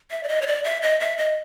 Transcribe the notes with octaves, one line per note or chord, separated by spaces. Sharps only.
E5
D5
D#5
C#5
D5
E5
D#5
E5
D#5